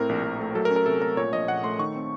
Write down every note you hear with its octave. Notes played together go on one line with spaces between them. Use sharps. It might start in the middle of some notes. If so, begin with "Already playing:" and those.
Already playing: A2 C4 A#4
A#1
A#1
A3
F#3 A4
A#4
C#4
A#4
C3 A4
A3 A#4
A#2 C#5
A#1 D#5
A#1 F#5
A3 C6
D#3 C#6
C4